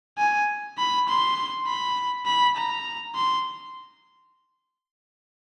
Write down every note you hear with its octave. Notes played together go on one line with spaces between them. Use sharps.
G#5
B5
C6
B5
B5
A#5
C6